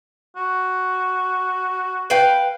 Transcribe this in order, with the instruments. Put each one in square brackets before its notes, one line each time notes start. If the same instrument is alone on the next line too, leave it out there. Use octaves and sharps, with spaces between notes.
[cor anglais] F#4
[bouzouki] B4 F5 G5